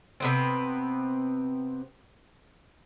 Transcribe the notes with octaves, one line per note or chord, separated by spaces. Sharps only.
C3 B3 C4